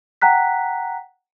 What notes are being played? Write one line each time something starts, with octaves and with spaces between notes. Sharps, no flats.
F#5 G5 A#5 F#6 B6